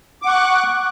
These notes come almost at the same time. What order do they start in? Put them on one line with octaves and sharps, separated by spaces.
D6 F#5 C#6 F#6